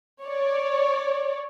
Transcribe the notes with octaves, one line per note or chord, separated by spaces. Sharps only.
C#5 D5